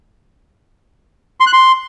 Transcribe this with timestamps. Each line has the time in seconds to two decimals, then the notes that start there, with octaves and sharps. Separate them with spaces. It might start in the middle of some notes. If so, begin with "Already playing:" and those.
1.40 C6
1.46 F#6
1.53 C6